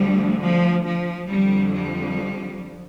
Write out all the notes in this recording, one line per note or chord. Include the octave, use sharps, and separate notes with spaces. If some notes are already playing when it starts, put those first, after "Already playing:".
Already playing: D2 D3 F3 G3
F3
F3
F2 D3 F3 G3
G3